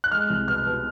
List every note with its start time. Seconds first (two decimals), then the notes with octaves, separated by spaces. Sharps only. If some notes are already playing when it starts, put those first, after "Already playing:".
0.04 F#6
0.12 G#3 F6
0.30 C2
0.48 B2 F6
0.66 B2